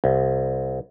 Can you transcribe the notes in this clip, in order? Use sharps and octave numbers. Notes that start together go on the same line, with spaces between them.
C2